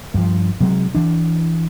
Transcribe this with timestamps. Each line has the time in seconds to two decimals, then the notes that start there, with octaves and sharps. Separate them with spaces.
0.14 G2 F3
0.60 C3 F#3 G#3
0.95 E3 D4